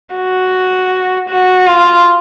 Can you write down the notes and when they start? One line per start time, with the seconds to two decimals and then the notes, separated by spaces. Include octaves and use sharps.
0.15 F#4
1.29 F#4
1.67 F4